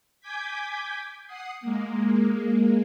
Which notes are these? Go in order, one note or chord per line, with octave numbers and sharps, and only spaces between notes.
G#5 D6 G6 G#6 B6
F#5 D#6 C7
G#3 A#3